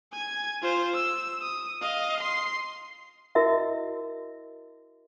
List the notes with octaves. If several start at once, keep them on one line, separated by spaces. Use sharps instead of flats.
G#5 G#6
F4 C5
E6
D#6
D#5 F5
C6 C7
E4 F#4 A#4 D#5 E5